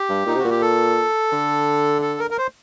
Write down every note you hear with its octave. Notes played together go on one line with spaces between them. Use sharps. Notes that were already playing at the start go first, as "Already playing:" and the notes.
Already playing: G4
G2
A#2 D#4
C3 F#4
A#2
G4
A4
D3
A4
A#4
A#4
C5